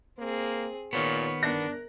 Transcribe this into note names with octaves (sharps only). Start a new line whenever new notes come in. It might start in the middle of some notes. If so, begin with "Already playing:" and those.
A#3 C4 G#4
A#2 D#3 B3 F4 C#5
G1 D4 A#4 F#6 A#6